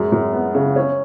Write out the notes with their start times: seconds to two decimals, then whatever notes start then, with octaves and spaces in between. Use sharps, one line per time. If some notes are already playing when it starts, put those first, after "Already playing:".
Already playing: F#2 G#3
0.12 F#2
0.33 B3
0.55 C#3
0.76 C#4